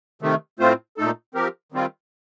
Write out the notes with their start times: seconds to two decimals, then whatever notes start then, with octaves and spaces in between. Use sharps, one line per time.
0.22 C3 D#3 A3
0.60 A2 A3 C4 F4 C5
0.97 A#2 A3 D#4 A4
1.35 F3 C4 G4 A#4
1.72 D#3 G3 C4 F4